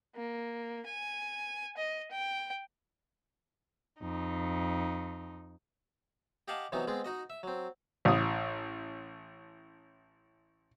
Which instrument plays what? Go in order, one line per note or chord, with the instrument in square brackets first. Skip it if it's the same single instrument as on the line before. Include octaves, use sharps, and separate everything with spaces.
[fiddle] A#3
G#5
D#5
G5
[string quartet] F2 D#4
[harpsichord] G4 D#5 F5 F#5 G#5 A5
C3 E3 F#3 B3 D#4
G#3 B3 C4 G#4
D#4 F#4 D#5
E5
F#3 C4
[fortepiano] A1 D#6